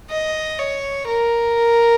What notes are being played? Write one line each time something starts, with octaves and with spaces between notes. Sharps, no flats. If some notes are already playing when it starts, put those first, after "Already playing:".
D#5
C#5
A#4